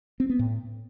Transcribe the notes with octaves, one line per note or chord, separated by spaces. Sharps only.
C4
B3
A2